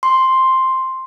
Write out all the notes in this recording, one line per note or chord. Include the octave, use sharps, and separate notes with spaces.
C6